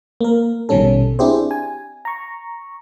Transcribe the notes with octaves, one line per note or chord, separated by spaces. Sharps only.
A#3 A#4
A#1 B2 D#3 G3 C#4 A4
C4 D4 E4 G4 G#4 C5
G#5
A#5 C#6